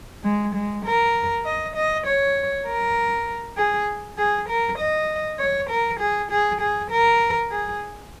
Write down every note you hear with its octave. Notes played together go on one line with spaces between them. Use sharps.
G#3
G#3
A#4
D#5
D#5
C#5
A#4
G#4
G#4
A#4
D#5
C#5
A#4
G#4
G#4
G#4
A#4
G#4